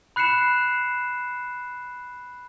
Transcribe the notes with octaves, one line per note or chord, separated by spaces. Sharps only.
B5 F#6 C7 C#7 E7